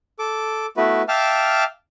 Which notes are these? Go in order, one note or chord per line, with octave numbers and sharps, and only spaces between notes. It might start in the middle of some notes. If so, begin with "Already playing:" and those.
A4 D6
A3 B3 E4 F#4 B4
E5 F5 G5 A5 D6 F6